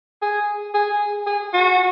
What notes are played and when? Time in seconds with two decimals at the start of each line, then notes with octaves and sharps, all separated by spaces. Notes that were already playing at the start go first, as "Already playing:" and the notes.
0.22 G#4
0.74 G#4
1.27 G#4
1.53 F#4